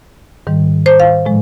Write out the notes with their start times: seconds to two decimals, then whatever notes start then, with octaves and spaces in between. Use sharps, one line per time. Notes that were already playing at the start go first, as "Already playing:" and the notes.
0.47 G#2 D#3 G3
0.86 C5
1.00 F5
1.25 A2 F3 G#3